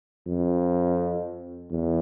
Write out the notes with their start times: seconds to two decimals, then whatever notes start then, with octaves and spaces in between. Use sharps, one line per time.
0.27 F2
1.70 E2